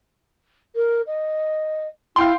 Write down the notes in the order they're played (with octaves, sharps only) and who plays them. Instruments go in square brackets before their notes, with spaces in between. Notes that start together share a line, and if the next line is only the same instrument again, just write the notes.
[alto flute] A#4
D#5
[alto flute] E4 [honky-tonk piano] F5 G5 C6